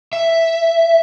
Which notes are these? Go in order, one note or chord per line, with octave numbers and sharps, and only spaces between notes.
E5